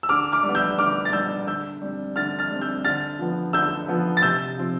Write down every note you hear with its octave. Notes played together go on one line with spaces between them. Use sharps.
E6
D3 D6 F6
D6 F6
G3
B3
E6 G6
D3 D6 F6
A6
G3 B3 E6 G6
D3 E6 G6
G3 C4
D3 F6 A6
F6 A6
G3 C4
E6 G6
D3 F6 A6
F3 B3
D3 E6 G6
F3 B3
A6
C3 E6 G6
F3 C4